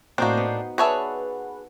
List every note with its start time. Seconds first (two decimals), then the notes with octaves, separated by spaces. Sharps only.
0.18 A2 A#3 C4 D4 D#4 F#4 G6 C7
0.37 B3
0.78 G#4 B4 C#5 D5 E5 F#5 A5 B5